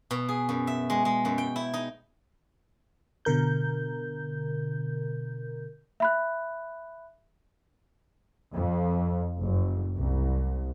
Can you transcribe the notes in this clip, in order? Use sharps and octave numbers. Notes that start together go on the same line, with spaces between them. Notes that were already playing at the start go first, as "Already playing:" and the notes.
B2
G#4
F#2
E5
G#3
G#3
F#2
G5
E4
D#4
B2 D3 A#4 G6
E5 B5 F#6
F2
F#1
C2